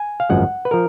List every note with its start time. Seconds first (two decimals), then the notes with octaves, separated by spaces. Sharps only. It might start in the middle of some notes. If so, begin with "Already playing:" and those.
Already playing: G#5
0.20 F5
0.30 G#1 F#2 F3 G#3 F#5
0.65 B4
0.71 F3 A#4